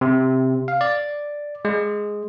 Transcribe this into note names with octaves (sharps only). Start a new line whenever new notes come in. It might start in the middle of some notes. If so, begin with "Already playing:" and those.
C3
F5
D5
G#3